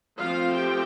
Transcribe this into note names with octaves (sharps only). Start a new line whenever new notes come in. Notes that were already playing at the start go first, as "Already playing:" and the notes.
F3 A3 C4 F4 F5
G4 G5